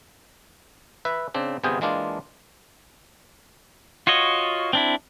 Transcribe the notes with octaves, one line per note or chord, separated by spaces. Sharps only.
B4 E5
C#3 C4 D4
G1 C3 B3 F4 G#4 G5
E3 G#3 A#3 D4 F4
F4 F#4 C#5 D#5
C4 D4 E4